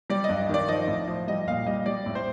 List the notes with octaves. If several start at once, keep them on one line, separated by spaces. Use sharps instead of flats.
G3 D5
D#5
G2
D#3 D5
F3 D#5
A2
F3
G3 D#5
A#2 F5
G3 D#5
G3 D5
A2
C5